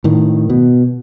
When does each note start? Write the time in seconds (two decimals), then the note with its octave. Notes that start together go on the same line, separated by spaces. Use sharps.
0.04 A2 D#3
0.49 B2